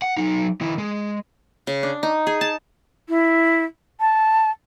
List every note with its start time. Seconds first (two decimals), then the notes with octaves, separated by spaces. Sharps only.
0.02 F#5
0.17 F#3 D#4
0.61 D#3 E4
0.78 G#3
1.67 C#3
1.83 D4
2.03 D#4
2.27 G#4
2.41 A5
3.09 E4
4.00 A5